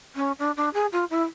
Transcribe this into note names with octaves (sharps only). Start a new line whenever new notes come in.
C#4
D4
D4
G#4
F4
E4